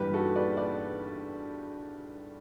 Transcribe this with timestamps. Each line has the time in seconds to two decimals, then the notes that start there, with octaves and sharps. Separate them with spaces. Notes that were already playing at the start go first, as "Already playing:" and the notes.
Already playing: G1 G2 E3 G3 G4 B4
0.14 F#4 A4
0.36 B4 D5
0.57 B4 D5